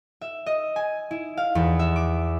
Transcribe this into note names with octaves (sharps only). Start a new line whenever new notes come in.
E5
D#5
G#5
E4
F5
E2
E5
D6